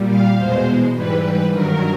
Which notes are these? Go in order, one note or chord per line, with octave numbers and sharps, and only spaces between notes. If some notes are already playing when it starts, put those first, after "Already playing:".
Already playing: A#2 G3
F5
E2 B2 G#3 C5
G#2 E3 G3 B4
G2 D#3 F#3 A#4